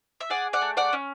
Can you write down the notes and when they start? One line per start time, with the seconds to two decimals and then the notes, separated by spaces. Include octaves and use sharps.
0.20 E5
0.30 G#4 D5 F#5
0.53 D5 F#5
0.62 A3
0.77 D5 F#5
0.93 C#4